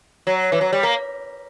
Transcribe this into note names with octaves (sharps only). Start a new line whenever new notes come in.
F#3
E3
F#3
G3
A#3